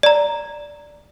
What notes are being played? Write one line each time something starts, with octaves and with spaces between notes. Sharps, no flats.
D5 A#5